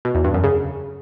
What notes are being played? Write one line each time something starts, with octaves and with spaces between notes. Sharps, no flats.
B2
E2
G2
F#2
C#3